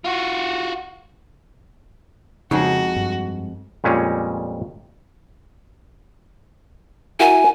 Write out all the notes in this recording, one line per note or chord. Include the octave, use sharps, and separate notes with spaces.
F4 F#4
F2 C#3 G#3 D#4 F#4 A#5
G2
F2 A#2 G3 G#3 C#4
E4 F#4 A#4 G#5